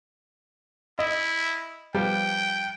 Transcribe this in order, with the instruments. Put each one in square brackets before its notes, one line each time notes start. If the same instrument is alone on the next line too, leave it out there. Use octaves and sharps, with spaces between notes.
[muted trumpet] E4 [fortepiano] D#5
[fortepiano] F3 G3 B3 [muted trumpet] G5